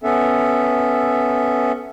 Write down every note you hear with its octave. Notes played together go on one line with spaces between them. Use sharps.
B3 C#4 A4 E5